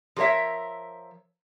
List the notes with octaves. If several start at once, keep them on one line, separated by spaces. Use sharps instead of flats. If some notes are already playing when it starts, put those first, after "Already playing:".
F3 G#4 A#4 C#5 E5